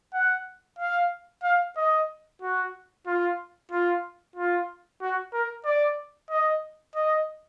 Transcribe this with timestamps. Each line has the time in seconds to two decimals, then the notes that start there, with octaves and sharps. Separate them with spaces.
0.14 F#5
0.79 F5
1.43 F5
1.77 D#5
2.42 F#4
3.07 F4
3.71 F4
4.36 F4
5.01 F#4
5.33 A#4
5.65 D5
6.30 D#5
6.96 D#5